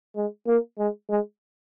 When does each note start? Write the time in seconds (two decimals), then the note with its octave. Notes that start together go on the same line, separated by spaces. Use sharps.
0.16 G#3
0.47 A#3
0.78 G#3
1.09 G#3